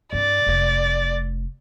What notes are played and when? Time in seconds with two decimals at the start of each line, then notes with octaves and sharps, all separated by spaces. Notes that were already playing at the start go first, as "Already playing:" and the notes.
0.13 G2 C4 D5
0.46 F1 A3